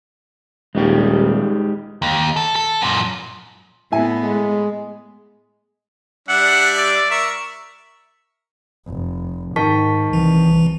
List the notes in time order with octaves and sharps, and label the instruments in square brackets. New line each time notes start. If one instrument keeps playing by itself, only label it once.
[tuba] D#1 [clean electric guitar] G#3 D#4 G4
[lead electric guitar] D#2
A4
A4
F#2 A#2
[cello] A2 B3 [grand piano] E4 E5 G#5
[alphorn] G#3
[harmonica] G3 D4 E5 [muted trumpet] F#5
[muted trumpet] D5
[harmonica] A#4 C#6 [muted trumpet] E5
[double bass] F1
[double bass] G#2 [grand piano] D#3 [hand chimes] A5 C#6 B6
[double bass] C2 [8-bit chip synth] E3